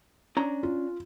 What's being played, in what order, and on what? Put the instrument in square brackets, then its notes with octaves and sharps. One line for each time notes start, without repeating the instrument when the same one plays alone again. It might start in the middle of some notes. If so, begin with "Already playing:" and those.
[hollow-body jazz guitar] C#4 D4 A#5
[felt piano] F4